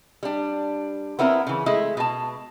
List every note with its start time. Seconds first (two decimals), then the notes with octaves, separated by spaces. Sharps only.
0.23 G3 D4
1.19 B3 C4 E4 A#4
1.47 C#3 E3
1.66 G#3 A3 E4
1.97 B2 A5